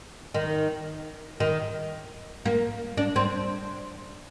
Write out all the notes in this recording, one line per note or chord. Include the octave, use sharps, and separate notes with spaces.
D#3
D#3
A#3
D4
C4